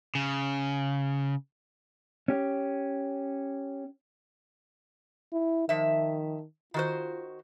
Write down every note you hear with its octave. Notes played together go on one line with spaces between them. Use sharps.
C#3
C#4 G4
E4
D#3 F3 E5
D#3 F4 F#4 C5